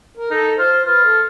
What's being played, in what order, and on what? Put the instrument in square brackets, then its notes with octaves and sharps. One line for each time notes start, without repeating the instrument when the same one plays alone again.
[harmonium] A#4
[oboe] D#4 [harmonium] A4
[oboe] F4 [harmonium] C5
[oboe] F4 [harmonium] B4
[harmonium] A4